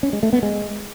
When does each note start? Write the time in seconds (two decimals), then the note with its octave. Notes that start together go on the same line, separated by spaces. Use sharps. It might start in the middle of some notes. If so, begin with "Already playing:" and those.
0.03 C#4
0.13 G#3
0.23 A3
0.33 B3
0.43 G#3